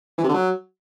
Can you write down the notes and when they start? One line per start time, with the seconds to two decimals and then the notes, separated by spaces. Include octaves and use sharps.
0.18 E3
0.23 C3
0.29 D3
0.34 F#3